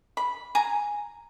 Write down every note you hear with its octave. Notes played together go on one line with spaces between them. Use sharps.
B5
G#5 A#5